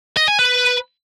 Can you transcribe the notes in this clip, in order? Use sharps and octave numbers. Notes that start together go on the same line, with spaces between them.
D#5
G#5
B4